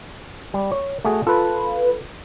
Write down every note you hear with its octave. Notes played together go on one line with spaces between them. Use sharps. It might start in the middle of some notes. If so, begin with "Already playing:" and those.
G3
C#5
A3 F#4 G#4
F4 A4 B4